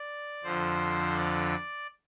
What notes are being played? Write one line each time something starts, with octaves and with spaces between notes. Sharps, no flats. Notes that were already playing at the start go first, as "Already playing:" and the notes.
Already playing: D5
F2 D3 F3 C5
D5